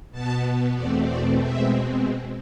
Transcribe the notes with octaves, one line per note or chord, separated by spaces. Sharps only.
B2 B3 A5
E2 B2 A3 C4 D5
D5
B2 G#3 C4 E5